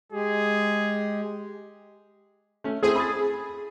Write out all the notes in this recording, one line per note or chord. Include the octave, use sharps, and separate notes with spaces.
G#3 G4 G#4
A3 C#4
A3 C4 E4 G#4
B5 D#6 A6